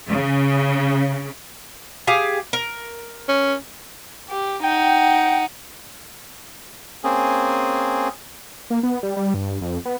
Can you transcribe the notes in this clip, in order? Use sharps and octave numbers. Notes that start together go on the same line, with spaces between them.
C#3
G4 G#4 F5
A#4
C#4
G4
D#4 F#5 G5
A#3 C4 C#4 G#4
A#3
B3
G3
G3
G2
F2
B3